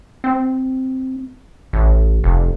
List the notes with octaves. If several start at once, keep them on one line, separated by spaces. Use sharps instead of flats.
C4
A1
F1